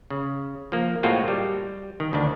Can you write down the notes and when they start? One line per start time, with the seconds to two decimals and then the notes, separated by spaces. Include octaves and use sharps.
0.10 C#3
0.72 F3 A#3
1.03 A2 G#3 A#3 C4 F4 F#4
1.28 G3
2.00 D#3
2.13 D2 D#3 D4